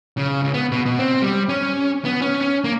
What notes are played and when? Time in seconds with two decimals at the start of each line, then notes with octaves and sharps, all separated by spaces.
0.18 C#3
0.41 C#2
0.54 B3
0.72 B2
0.86 B2
0.99 C4
1.22 G3
1.49 C#4
2.05 B3
2.22 C#4
2.41 C#4
2.64 A#3